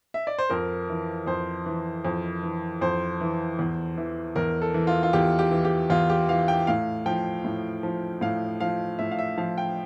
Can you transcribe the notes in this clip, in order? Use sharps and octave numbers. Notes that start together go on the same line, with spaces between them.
E5
D5
C5
F2 A#4
E3
F2 C5
E3
F2
E3
F2 C5
E3
E2
E3
E2 A#4
A4
E3
F4
F4
E2 G4
G4
E3
G4
E2 F4
G4
E3 F5
G5
A2 F5
F3 G5
A2
F3
A2 F5
F3 F5
A2 E5
F5
E5
F3 F5
G5